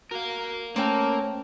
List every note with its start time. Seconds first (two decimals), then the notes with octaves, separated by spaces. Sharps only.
0.11 F#4 A#4 F5
0.76 A3 A#3 C4 C#4 A4 A#4 G5